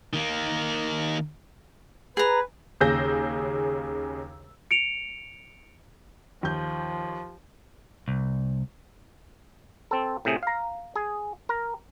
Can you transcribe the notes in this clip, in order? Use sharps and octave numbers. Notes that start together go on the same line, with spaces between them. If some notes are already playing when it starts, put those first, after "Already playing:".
D#3 A#3
G#4 B4 A#5
D#2 C#3 G#4 E6 G6 A#6
C#7 D7 F7
D#2 F3 G6
C2
C4 A4
A2 C3 G#4
F5 A#5
G#4
A#4